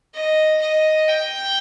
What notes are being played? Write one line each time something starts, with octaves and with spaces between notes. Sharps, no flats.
D#5
D#5
G5